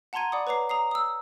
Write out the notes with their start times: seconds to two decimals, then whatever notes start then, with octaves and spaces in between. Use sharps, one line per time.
0.13 F#5 A5 A#5 C6 G#6 D#7
0.32 D5 F#5 B5 D6 D#6
0.47 B4 C#5 A#5 D6 C7
0.69 A#5 D#6 C7
0.91 D#6 E6